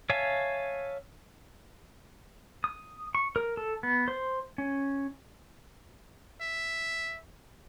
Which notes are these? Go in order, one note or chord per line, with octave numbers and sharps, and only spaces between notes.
C#5 E5 F5 G#5 A5
D#6
C#6
A#4
A4
B3
C5
C#4
E5